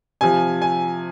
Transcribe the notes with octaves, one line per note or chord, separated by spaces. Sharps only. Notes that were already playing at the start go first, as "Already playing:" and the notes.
C3 F3 G#5
G#5